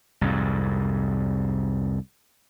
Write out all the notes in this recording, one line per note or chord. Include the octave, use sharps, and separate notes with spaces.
C2 F2 G#2